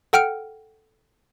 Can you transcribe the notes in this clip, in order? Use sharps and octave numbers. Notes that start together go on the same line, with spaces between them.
A4 F#5 G5 F6 D7